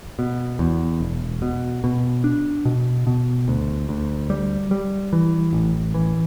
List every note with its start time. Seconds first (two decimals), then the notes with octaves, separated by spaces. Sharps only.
0.19 B2
0.59 E2
1.00 E1
1.42 B2
1.84 B2
2.24 D4
2.65 B2
3.07 B2
3.48 D2
3.89 D2
4.30 G3
4.71 G3
5.13 E3
5.53 A1
5.94 E3